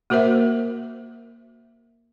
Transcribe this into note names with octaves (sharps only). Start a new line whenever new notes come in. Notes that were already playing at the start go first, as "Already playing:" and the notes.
A#3 F#4 A#4 C5 E5